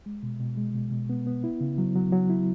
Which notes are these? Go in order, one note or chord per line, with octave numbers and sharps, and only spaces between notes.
G#3
B2
B2
G#3
B2
B2
B3
B3
E4
C#3
F#3
F#3
F#3
E4